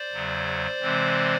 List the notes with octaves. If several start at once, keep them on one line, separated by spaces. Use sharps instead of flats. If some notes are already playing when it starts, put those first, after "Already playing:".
Already playing: C5 D5
E2 C#3 F#3
C3 E3 G#3 C4